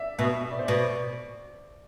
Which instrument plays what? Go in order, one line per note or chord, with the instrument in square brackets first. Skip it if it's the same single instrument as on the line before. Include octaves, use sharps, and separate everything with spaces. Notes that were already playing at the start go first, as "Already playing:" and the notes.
Already playing: [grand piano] D5 E5
[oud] B2 [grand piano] E5
[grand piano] E5
D5
C5
[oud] B2 [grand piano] D5